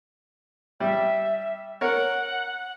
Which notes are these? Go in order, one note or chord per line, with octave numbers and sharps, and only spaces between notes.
G3 E5
A#4 C#5 F#5